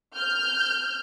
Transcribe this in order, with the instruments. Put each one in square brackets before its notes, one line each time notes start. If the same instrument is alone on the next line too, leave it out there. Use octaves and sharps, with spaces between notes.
[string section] F6 G6